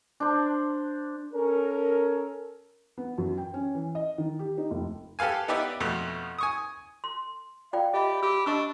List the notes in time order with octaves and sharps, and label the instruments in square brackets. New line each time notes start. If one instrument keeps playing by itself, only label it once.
[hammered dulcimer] D4 C5
[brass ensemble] C#4 A4 A#4
[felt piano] B3
F#2
G5
C#4
E3
D#5
D#3
G4
D#4
F1
[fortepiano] G4 A4 B4 F5 G#5
B3 D#4 G4 B4 D5 E5
F2 B2 A3
G#5 C#6 D#6
[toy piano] C6
[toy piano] F4 D5 G5 [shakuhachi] F5
[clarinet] G4 [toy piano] D#5 E5 [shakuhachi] B5
[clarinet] G4 [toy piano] E6
[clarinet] D4 [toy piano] D#5 C#6 E6